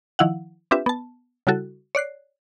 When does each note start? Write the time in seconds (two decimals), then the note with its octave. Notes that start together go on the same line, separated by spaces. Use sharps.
0.19 D#3 F3 E4 F5 F#5
0.71 C4 D4 F4 G4 B4 E5
0.86 B3 A5
1.47 C#3 G3 E4 F#4 A4
1.95 C#5 D5 F#6 C7